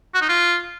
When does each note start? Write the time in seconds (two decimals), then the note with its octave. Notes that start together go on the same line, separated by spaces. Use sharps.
0.14 F#4
0.22 D#4
0.29 F4